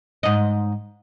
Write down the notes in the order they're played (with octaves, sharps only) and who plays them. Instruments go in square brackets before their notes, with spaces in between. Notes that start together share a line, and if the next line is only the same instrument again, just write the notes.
[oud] G#2 D#5